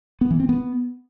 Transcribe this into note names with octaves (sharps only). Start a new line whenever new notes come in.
B3
E3
C4
B3